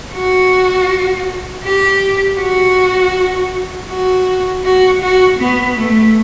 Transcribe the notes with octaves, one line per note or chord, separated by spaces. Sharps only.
F#4
G4
F#4
F#4
F#4
F#4
B3
A3